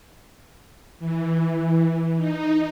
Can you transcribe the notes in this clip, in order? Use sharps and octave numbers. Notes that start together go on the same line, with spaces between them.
E3
D#4